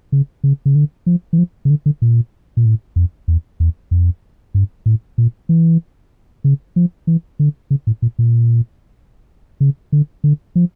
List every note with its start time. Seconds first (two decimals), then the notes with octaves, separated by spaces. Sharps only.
0.12 C#3
0.44 C#3
0.65 C#3
0.75 D3
1.06 F3
1.33 E3
1.38 F3
1.65 C#3
1.70 D3
1.86 D3
2.02 A#2
2.57 A#2
2.65 A2
2.96 F2
3.28 E2
3.60 E2
3.91 F2
4.54 G2
4.86 A2
5.18 A#2
5.49 E3
6.44 C#3
6.76 F3
7.07 E3
7.39 D3
7.70 C#3
7.87 A2
8.02 A#2
8.19 A#2
9.60 C#3
9.92 D3
10.24 D3
10.56 F3